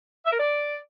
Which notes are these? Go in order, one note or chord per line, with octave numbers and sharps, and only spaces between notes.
E5
A#4
D5